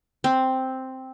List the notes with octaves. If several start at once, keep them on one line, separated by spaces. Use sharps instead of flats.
C4